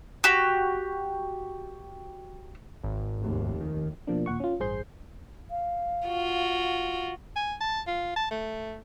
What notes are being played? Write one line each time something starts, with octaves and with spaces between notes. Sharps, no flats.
F#4 G4
G#1
F1 D#2
D#3
B2 F3 A#3 D4
D#2 A#2 F#5 C#6
C#4 F4
A1 G2 G#4 C5 G6 C7
F5
F4 F#4
G#5
A5
F4
A5
A3